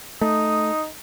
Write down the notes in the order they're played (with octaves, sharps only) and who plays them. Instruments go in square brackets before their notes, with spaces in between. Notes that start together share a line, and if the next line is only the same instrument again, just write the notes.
[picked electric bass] A3 [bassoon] D#4 [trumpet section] D#6